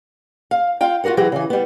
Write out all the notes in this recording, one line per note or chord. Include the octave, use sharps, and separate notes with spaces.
F5
F4 F5 G5
F4 F#4 G#4 A#4 F#5
E3 F#3 G4 G#4 C5
C#3 E3
G3 B3